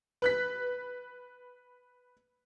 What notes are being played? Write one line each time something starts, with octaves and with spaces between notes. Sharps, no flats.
B4 F#6 B6